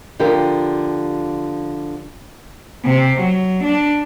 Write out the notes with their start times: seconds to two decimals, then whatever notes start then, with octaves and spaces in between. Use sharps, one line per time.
0.20 D3 F3 G4 A#4
2.85 C3
3.19 F#3
3.63 D4